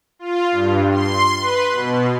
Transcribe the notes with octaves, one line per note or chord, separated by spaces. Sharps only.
F4
G2
C6
B4
B2